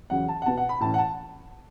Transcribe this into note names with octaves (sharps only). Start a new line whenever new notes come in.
E2 C#3 F#3 C#4 F#5
A5
F#5
B2 B3 A5
F#5
B5
A2 E3 C#4 A5
F#5
A5